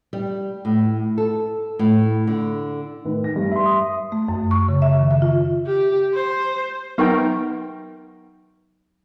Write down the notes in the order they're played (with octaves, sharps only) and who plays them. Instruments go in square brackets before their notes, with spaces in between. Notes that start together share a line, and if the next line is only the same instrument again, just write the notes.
[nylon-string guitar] G3
A2
A4
A2
D3
[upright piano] A2 D#3 B4
A#6
G2
[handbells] E5 C6
D#6
[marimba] A3
F#2
C#6
C#3
E5
D#3
E5
F4
[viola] G4
C5
[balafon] F#3 D#4 C#6 [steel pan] B3 A#4 G5